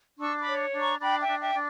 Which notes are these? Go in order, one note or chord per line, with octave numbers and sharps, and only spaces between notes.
D4 C#6 E6
B5 D6
C#5
D4
A#5 C#6
D4 G5 B5
E5 G5
D4
E5 G5
D4